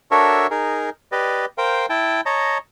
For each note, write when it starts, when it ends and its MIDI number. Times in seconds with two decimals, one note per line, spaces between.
0.11 0.47 62
0.11 0.47 66
0.11 0.47 69
0.11 0.47 70
0.11 0.47 73
0.11 0.47 76
0.51 0.90 63
0.51 0.90 68
0.51 0.90 70
1.12 1.45 67
1.12 1.45 71
1.12 1.45 74
1.12 1.45 75
1.58 1.86 70
1.58 1.86 72
1.58 1.86 77
1.58 1.86 79
1.90 2.21 64
1.90 2.21 79
1.90 2.21 81
2.26 2.58 73
2.26 2.58 75
2.26 2.58 81
2.26 2.58 82